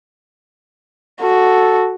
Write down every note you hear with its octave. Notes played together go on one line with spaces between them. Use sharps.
F#4 A4